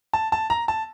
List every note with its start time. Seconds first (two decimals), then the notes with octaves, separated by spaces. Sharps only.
0.13 A5
0.32 A5
0.50 A#5
0.68 A5